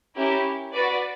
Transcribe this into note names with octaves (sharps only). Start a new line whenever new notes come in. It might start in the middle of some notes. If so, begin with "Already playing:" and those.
C#4 E4 G4 A#4
F#4 B4 D5